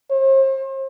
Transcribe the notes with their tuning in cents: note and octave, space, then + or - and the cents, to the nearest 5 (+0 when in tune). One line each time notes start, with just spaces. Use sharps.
C5 +40